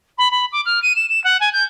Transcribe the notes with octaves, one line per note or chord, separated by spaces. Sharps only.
B5
B5
D6
F6
D#7
E7
E7
F#5
G#5
G6